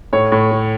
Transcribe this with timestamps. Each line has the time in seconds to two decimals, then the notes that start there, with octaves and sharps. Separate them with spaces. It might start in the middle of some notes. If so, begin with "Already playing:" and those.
0.13 A2 C#5
0.32 A2
0.51 A3